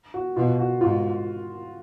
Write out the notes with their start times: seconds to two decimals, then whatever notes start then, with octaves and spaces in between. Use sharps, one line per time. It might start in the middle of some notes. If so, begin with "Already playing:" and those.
0.14 F#4
0.36 B2 F4
0.59 F#4
0.81 G#2 F4